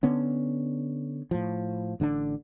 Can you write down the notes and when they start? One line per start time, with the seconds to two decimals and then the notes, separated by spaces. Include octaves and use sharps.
0.03 D3 B3 C#4
1.31 A2 F3
2.00 A1 D3 F#3 D4